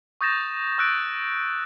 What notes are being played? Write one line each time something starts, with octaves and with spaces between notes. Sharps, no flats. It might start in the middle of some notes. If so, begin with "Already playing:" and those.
C#6 D#6 G6 A6 A#6 E7
C#6 E6 F#6 A6 D7